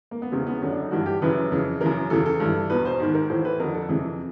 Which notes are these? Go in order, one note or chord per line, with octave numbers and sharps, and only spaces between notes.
A#3
B3
E2 C#3 E3 C4
B3
F#2 D3 C#4
D4
D#4
G2 E3 F#4
G4
F#2 C#3 E3 B4
F2 C#3 E3
F#2 C#3 E3 A#4
E2 C#3 E3 A4
A4
G2 E3
E2 B2 B4
C5
G#2 D#3
A#4
A2 E3 C5
B4
F2 D3 A#4
A4
F2 C3 E3 G#4